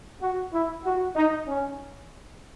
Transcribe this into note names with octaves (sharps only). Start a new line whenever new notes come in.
F#4
E4
F#4
D#4
C#4